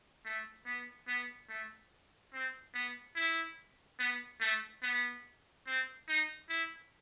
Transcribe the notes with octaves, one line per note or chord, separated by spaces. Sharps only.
A3
B3
B3
A3
C4
B3
E4
B3
A3
B3
C4
D#4
E4